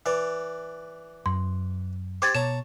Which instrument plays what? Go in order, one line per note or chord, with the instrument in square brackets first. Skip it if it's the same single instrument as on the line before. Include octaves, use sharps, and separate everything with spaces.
[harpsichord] E3 D5
[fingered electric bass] F#2 [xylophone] C6
[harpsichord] G4 C5 [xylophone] D6 G#6 A6
[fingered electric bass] B2 [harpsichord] C#5 A5 A#5 [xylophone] E7